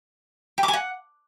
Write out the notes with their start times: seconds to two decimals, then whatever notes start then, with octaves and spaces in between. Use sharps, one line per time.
0.58 G5
0.63 D6
0.68 G#5
0.73 F#5